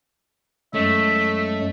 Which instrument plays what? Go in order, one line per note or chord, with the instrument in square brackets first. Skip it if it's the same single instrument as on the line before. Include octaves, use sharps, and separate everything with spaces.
[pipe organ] F#2 F#3 G#3 [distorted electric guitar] A3 [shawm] E5